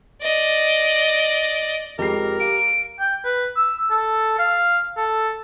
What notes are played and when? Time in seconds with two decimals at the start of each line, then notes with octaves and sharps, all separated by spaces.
0.22 D5 D#5
1.99 F2 G#3 G4 A#4 C7
2.40 F5 D7
2.99 G5
3.24 B4
3.56 E6
3.90 A4
4.39 F5
4.97 A4